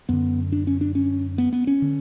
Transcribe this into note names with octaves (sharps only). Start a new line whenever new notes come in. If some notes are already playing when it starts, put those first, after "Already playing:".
F#2 D3 B3
D4
C#4
D4
C#4
B3
B3
C#4
D3